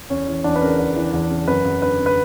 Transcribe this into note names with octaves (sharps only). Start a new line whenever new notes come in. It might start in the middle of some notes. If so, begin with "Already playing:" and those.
E2 C#4
E3
E2 D4
B4
C#3 A#4
E2
E3
E2
C#3
F#2 B4
F#2
D3 B4
D3
B4